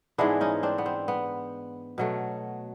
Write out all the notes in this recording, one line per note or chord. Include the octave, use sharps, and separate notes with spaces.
G#2 E3 G#3 B3 D4 E4
C#4 D#4
C4 D4
B3
C4
B3
B2 F#3 A3